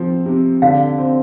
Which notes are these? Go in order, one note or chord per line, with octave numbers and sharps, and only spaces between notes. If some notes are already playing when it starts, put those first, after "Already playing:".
Already playing: F3 C4
C3
D3 F5
C4